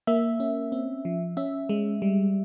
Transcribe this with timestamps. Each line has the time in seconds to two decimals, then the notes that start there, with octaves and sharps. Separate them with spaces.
0.07 A#3 E5
0.40 C#4
0.72 C4
1.05 F3
1.37 C#4 E5
1.69 G#3
2.02 G3